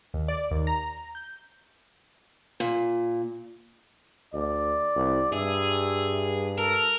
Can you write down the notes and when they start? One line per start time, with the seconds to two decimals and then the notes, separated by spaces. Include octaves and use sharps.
0.14 D#2
0.28 D5
0.51 D#2
0.67 A#5
1.15 G6
2.60 A#2
4.34 D2 D5
4.96 C2
5.32 G2 G#4 E5
6.58 A4 A#4